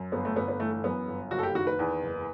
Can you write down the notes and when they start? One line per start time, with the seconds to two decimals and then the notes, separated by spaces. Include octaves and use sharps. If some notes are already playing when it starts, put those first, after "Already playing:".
Already playing: F#2
0.12 G1 B3
0.25 A3
0.36 G1 B3
0.48 B3
0.60 E3 A3
0.72 A3
0.84 F#2 B3
1.08 G1
1.31 F#1 F#4
1.38 A4
1.43 G4
1.55 D#3 F#4
1.67 B4
1.79 E2
2.03 F#1